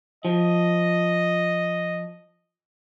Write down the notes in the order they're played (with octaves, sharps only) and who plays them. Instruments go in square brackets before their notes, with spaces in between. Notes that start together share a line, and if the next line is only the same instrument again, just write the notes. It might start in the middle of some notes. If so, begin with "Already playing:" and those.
[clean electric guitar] F3 [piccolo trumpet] D#5